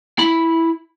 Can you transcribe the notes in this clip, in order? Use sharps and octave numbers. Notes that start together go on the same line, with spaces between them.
E4 B5